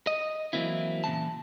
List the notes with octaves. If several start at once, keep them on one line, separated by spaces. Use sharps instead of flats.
D#5
E3 F#3 A#3 C4 E4
A#2 C#3 E3 A5